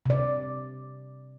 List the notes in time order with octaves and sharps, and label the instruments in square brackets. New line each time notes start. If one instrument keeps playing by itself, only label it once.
[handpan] C3 D5